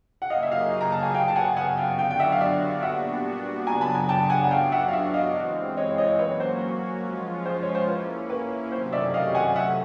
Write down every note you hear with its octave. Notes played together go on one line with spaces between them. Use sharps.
F#5
C#3 F#3 A#3 D#4 G#4 D#5 F5
E5
D#5 F5
A#5
A5
G#5
C#3 F#3 B3 F5 G5
A5
F#5 G#5
F#5 G#5
F5 G5
D3 F#3 B3 D4 F#4 F5 G5
G5
E5 F#5
F5
D5 E5
A#2 G3 B3 D4 F#4 E5 F#5
C#3 F#3 B3 D4 G#5 A#5
A5 B5
G#5 A#5
G5 A5
F#5 G#5
F#5
F#3 B3 D4 F#4 F5 G5
E5 F#5
F5
E5 F#5
D#5 F5
E3 G#3 C4
C#5 D#5
C#5 D#5
F#3 A#3 C#4 F#4 B4 C#5
C5
F3 G#3 C#4 F4
C5
C#5
C5
A#3 C#4 E4 B4
B4
C3 D#3 F#3 A3 C#4 C5
D5 E5
D#5 F5
F#5 G#5
E5 F#5